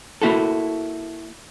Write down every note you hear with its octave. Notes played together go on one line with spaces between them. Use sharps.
A#3 E4 F#4 A4